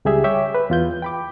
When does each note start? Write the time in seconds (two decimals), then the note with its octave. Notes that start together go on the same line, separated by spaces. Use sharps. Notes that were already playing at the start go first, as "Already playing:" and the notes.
0.05 C#2 G3 G4 G#4 E5
0.24 C#5 E5 G5 D6
0.55 B4
0.70 E2 F4 G6
1.02 G5 B5 D6